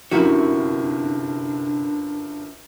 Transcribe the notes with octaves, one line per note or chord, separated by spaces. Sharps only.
G1 F#2 C3 D4 E4 F#4 A#4